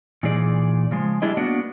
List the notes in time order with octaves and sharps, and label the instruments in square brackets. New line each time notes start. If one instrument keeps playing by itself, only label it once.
[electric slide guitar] A#2 E3 D#4 G#4 D5
C#3 F3 G#3
G3 D4 E4 G#4 D#5
A#3 B3 D4 F#4 D5 F#5